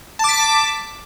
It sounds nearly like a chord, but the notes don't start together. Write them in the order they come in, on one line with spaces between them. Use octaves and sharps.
A5 D6 B6